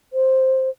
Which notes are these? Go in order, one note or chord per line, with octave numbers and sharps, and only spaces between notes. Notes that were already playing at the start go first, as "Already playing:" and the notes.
C5